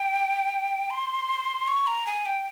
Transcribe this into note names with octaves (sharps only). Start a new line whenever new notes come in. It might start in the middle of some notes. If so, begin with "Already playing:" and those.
Already playing: G5
C6
C#6
A#5
G#5
G5